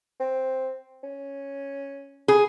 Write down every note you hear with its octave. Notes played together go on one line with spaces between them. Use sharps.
C4
C#4
G#4